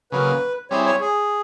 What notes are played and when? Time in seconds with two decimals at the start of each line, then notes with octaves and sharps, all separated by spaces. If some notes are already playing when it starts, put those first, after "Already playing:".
0.12 C#3 F#3 A#3 B4
0.70 G3 C4 E4 G#4 C5 C#5
0.86 C#5
1.00 G#4